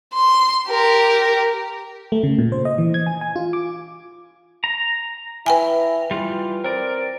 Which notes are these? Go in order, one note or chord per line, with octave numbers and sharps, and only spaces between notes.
C6
G4 A#4
A3
C#3
A#2
C5
D#5
E3
G#6
G#5
G#5
F4
D6
A#5
E4 B4 G5 G#5
E3 G3 F4
C4 A#4 D5